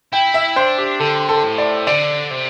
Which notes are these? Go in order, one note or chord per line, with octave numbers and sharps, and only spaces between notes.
E4 G5
E5
D4 C5
G4
D3 A4
A4
A2
D5
D3 D5
C3